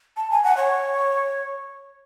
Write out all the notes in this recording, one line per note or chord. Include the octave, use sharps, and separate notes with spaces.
A5
G#5
F#5
C#5